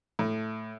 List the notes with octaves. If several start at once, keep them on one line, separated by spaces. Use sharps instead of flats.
A2